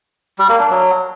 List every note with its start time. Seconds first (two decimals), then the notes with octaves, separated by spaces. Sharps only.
0.39 G3
0.49 A#3
0.60 D4
0.70 F#3